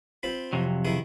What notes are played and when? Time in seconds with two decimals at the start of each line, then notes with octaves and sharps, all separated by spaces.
0.23 C4 F4 B5
0.53 F2 C3 F#3
0.85 D#3 E4 G#4